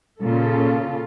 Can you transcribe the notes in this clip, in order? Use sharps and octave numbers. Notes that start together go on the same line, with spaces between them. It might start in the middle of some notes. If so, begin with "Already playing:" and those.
A#2 C#3 F4 A4